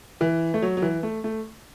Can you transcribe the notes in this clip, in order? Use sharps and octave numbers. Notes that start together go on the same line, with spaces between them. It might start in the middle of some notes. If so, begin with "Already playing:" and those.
E3
A3
F#3
F#3
E3
A3
A3